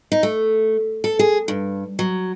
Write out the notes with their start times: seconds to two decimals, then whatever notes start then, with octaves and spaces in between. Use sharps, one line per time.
0.12 D#4
0.23 A3
1.04 A4
1.19 G#4
1.48 G2
1.99 F#3